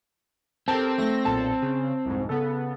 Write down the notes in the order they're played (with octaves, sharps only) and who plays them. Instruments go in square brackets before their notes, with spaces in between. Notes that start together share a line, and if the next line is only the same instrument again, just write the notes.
[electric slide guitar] C4 [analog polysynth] G4 A#4 [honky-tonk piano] A4 A5
[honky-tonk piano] A3 [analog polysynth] A#6
[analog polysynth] B1 A#2 A4 [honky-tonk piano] A5
[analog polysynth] C#3
C2 F2 G#2
[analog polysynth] C#3 B3 [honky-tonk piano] A4